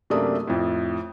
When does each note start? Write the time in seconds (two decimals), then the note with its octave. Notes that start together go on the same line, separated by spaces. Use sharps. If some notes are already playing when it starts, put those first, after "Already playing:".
0.10 F#2 C3 A3 A#3 D4 D#6
0.47 F2 A2